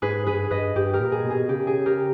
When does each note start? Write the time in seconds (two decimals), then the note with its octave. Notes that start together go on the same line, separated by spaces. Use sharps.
0.02 G#2 G#4 B4
0.26 G2 G#4 B4
0.51 G2 B4 D#5
0.76 G2 G4
0.93 G4 A#4
1.00 A#2
1.12 G#4
1.24 B2
1.30 G#4
1.49 C#3 G4
1.67 G#4
1.86 G4 A#4